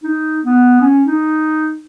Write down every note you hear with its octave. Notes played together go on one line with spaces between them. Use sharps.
D#4
B3
C#4
D#4